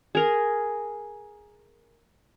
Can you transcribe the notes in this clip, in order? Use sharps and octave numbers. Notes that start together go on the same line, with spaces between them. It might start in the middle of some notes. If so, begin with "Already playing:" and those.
G#4 A#4